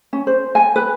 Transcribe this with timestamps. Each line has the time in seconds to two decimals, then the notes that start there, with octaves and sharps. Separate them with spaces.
0.13 C#4
0.27 C5
0.55 G#5
0.76 B4